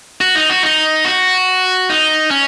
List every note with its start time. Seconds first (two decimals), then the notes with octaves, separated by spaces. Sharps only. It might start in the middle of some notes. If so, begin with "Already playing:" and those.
0.21 F#4
0.35 D#4
0.50 F#4
0.63 D#4
1.05 F#4
1.90 D#4
2.31 C#4